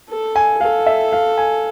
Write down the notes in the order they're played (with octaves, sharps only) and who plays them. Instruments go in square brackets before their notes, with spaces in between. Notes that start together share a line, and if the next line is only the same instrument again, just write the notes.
[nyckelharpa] A4
[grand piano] G#5
[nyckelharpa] A4 [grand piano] F5
[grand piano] E5
F5
G#5